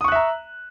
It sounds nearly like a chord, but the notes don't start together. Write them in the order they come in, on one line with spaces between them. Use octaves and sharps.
D#6 C#6 F#6 E5 A#5